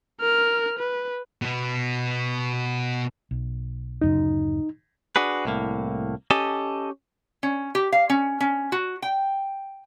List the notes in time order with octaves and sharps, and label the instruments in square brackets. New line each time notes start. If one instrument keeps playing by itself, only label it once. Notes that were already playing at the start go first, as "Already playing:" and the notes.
[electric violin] A#4 F6
B4
[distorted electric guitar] B2 B3
[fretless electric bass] B1
[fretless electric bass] D1 F#2 C#3 [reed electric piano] D#4
[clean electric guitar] D4 F#4 G#4 B4
C2 A2 A#3
C#4 G4 A4 D#5 G#5 A5
[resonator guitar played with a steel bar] C#4
G4
F5
C#4
C#4
F#4
G5